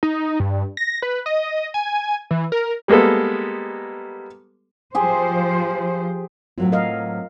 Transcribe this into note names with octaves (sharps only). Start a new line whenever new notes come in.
D#4
G2
A#6
B4
D#5
G#5
E3
A#4
G3 G#3 A#3 B3 A4
F3 G4 G#4 C5
A2 F#3 C4 F4
A#4 D#5 F5